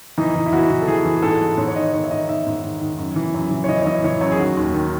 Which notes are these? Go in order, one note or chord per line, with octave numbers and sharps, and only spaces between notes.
E3 D#4
E3
E4
E3 F#4
E3
A4
E3 G#4
E3
G#4
G#2 A4
E3
G#2 C#5
C#5
D#3 D#5
D#3 C#5
E5
D#3 D#5
D#3 E5
G#2
D#3
D#3
F#2
E3
F#2
E3
C#5
E3 D#5
C#5
E3 D#5
E3 C#5
F#2 C#5
G#4
D#3 F#4
D#2
D#3